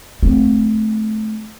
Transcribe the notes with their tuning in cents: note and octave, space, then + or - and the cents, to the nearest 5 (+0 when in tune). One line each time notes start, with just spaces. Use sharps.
A3 -20 C4 -10